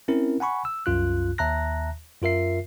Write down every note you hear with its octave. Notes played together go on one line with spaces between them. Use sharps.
C4 C#4 E4 A#4
F#5 G#5 B5 C#6
E6
C2 F#2 F4 F#6
D#2 E5 A5 A#5 F#6 A#6
F#2 F4 A#4 E5 C7